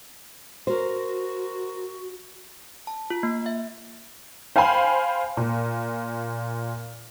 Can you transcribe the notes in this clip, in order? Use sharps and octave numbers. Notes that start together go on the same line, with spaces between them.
F#4 A#4 C5
A5
F4
A#3
E5
C5 F5 G5 G#5 B5 C6
A#2